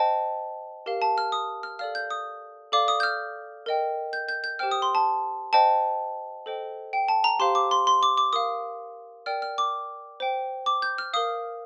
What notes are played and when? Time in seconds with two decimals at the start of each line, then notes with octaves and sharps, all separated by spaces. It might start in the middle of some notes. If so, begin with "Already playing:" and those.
Already playing: C5 D#5 G5 A5
0.86 G4 A#4 F5
1.02 A5
1.18 F6
1.32 D#6
1.63 F6
1.79 A4 D5 F5 F6
1.95 G6
2.10 D#6
2.72 A4 D5 F5 D6
2.88 D#6
3.00 G6
3.03 F6
3.66 A#4 D#5 G5
4.13 G6
4.28 G6
4.44 G6
4.59 G4 C5 G5 F6
4.71 D#6
4.82 C6
4.95 A5
5.53 C5 D#5 G5 A5
6.46 A4 C5 D#5 G5
6.93 G5
7.08 A5
7.24 A#5
7.39 G4 C5 F5 C6
7.55 D6
7.71 C6
7.87 C6
8.03 D6
8.17 D6
8.33 A#4 F5 D#6
9.26 A#4 D5 G5 F6
9.42 F6
9.58 D6
10.20 C5 G5
10.66 D6
10.82 G6
10.98 F6
11.13 A#4 F5 D#6